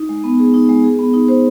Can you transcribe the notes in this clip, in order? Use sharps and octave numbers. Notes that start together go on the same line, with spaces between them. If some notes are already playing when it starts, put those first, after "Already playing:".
Already playing: D#4
G#3
B3
G#4
D#4
G#3
G#4
B3
D#4
C5